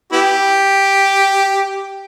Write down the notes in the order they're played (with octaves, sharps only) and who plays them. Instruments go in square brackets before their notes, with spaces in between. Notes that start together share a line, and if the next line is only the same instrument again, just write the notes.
[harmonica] B3 E4 G4